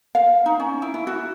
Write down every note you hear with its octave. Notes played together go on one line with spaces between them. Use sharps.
F5
D#4
C#4
E4
E4
F#4